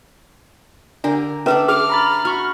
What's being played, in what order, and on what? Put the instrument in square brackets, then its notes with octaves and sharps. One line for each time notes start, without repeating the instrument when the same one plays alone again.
[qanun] D3 G4 A#4 [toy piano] D4 D5
[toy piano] C#4 B4 [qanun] D4 A4 E5
[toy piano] G#4 [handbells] D6 [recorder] F6
[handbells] A#5 B5 A6
[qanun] F#4 [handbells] B5 C#6 F6